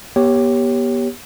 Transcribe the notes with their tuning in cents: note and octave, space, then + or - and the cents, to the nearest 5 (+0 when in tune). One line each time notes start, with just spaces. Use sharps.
B3 -40 G4 +0 C#5 +0